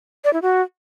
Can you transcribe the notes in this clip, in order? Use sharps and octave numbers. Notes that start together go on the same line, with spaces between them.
D5
E4
F#4